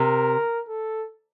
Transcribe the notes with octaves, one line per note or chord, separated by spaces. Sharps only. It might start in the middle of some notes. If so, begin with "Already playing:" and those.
Already playing: C3 A#4
A4